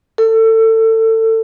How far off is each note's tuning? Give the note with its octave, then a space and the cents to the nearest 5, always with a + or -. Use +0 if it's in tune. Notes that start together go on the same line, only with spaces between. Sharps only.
A4 +25